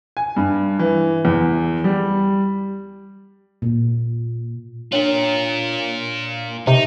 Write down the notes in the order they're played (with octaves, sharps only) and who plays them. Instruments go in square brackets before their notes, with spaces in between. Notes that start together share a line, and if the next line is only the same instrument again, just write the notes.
[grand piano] G#5
G2
E3
E2
G3
[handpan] A#2
[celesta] D4 C#5 F#7 [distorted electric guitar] F4 A#4
[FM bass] C3 [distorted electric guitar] D#4 [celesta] G4 E5